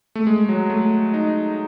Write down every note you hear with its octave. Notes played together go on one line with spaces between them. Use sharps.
A3
G#3
F#3
A3
D#4